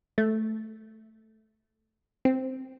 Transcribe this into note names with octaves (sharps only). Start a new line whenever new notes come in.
A3
C4